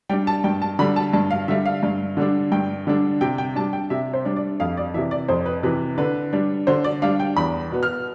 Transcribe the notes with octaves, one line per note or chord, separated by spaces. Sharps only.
G3 D4 G5
A5
G2 G5
A5
D3 G3 B5
A5
G2 A5
F5
D3 G3 E5
F5
G2
D3 G3 D4
G2 G5
D3 G3 D4
C3 G5
G5
G3 D4 A5
G5
C3 E5
C5
G3 D4
D5
F2 F5
D5
C3 E3 E5
D5
F2 C5
B4
C3 E3 B4
D3 B4
G3 D4
D3 C5
D5
G3 D4 F5
G5
E2 B5
B2 B3
F6